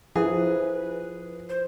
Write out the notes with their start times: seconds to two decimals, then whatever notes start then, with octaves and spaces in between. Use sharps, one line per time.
0.16 F3 E4 G#4 A4 B4 E5
1.49 C5